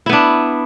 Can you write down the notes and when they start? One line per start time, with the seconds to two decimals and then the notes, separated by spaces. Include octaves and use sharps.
0.06 E4
0.09 B3
0.13 D4